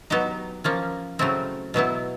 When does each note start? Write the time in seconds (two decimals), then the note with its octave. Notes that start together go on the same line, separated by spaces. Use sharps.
0.10 F#3 B3 D#4 G4
0.64 F3 A#3 C#4
1.19 C#3 F#3 A3 C4 E4
1.74 B2 F#3 B3 E4